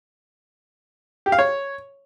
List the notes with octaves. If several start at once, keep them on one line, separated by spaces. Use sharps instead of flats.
G4
F5
C#5